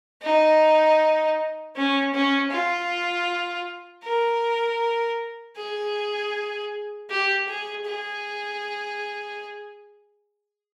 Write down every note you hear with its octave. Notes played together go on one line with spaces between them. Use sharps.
D#4
C#4
C#4
F4
A#4
G#4
G4
G#4
G#4